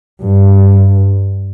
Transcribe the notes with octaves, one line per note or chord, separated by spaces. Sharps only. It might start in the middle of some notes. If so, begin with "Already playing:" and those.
G2